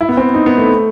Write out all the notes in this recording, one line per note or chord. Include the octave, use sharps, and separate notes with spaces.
E4
B3
C4
D#4
B3
A3